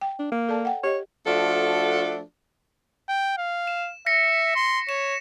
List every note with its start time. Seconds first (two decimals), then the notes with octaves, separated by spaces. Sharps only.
0.01 G5
0.19 D4
0.32 A#3
0.49 A4 D5 A5
0.65 F#5 G5
0.83 G4 C#5 D#5
1.26 F3 A3 D4 F#4 A4
3.09 G5
3.38 F5
3.67 E7
4.06 E5 A#6 B6 C#7
4.56 C6
4.89 C#5 E7